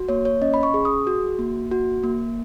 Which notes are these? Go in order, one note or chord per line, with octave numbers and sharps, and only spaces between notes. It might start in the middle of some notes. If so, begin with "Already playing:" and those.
Already playing: F#4
A#3 C#5
C#5
C#4 D#5
B5
C#6
G#4
D#6
F#4
A#3
F#4
A#3